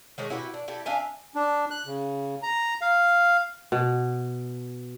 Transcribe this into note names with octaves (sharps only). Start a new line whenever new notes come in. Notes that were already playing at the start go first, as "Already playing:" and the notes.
D#3 G#3 A3 C#5
E4 F#4 G4 B4
D4
E4 G4 A4
D4 E5 F5 G#5
D4
F#6
C#3
A#5
F5
B2